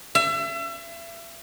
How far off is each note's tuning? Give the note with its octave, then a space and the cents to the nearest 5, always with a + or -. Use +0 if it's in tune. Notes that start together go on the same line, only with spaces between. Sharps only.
E5 +35